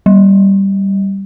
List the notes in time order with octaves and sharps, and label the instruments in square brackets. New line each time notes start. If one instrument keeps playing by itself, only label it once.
[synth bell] G3